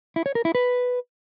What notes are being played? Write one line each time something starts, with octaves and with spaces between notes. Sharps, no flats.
E4
C#5
A#4
E4
B4